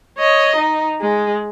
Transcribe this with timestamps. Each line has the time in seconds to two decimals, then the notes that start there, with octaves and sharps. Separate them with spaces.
0.18 C#5 D#5
0.56 D#4
1.01 G#3